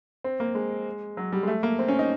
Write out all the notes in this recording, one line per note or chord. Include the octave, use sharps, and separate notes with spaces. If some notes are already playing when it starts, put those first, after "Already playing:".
C4
A#3
G#3
F#3
G3
G#3
A3
A#3
C4
C#4
D#4